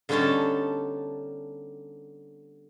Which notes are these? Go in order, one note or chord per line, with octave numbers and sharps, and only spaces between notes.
D3 G3 B3 C#4 D#4 A5